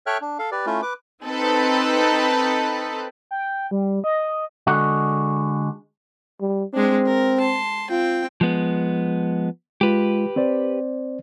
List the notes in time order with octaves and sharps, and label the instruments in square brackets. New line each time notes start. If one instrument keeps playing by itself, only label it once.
[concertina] A4 C#5 E5 G5 F6 F#6
D4
A4 F5
G4 B4 D5
A3 C#4 E4 F4
B4 D6
[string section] C4 D#4 A4 B4
[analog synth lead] G5
G3
D#5
[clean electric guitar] D3 G#3 F#4
[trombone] G3
[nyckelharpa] G#3 D4 [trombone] C4
[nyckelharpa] A#4
A5 C6
[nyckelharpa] C4 G5 [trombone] F4
[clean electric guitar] F3 G#3 B3
[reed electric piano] G#3 F4 [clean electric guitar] G4 B4
[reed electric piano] C4 C5 D5